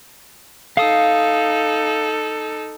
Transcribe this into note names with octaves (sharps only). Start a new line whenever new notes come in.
D#4 A4 F5 D#6